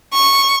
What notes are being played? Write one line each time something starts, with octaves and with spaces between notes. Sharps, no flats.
C#6